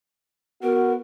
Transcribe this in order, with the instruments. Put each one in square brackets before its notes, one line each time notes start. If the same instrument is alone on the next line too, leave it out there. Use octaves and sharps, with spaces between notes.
[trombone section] B3 F#4 [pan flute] A#4